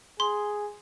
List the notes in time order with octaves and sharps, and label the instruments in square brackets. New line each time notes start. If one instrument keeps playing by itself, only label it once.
[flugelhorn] G#4 [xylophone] C6